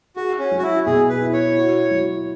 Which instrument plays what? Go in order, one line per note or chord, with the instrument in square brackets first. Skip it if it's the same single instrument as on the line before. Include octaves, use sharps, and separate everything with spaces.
[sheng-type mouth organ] F#4 [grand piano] G#4
[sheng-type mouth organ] C#4
[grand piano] F#3
[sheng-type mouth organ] F#4
E4
[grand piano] B2 [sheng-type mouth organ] G#4
[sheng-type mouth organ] B4
[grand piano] E4
[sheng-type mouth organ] C#5
[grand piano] F#4
F#3